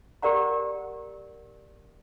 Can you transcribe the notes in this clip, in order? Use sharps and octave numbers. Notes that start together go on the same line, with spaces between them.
G4 A#4 D5 F#5 A#5